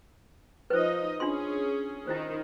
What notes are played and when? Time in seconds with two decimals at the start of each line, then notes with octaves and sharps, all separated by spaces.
0.70 F3 D#4 B4 C5 D#5
1.20 C#4 D4 F4 G#4 C6
2.07 D#3 E4 F4 C5